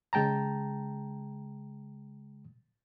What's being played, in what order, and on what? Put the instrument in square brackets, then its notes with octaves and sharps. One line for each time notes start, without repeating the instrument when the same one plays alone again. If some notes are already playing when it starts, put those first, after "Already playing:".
[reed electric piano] C#3 G#3 G5 A5 A#5